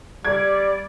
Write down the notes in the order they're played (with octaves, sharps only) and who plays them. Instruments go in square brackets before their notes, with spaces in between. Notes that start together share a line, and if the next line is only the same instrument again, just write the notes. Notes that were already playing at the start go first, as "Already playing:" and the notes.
[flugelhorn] G3 [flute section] D5 [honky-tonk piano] G#6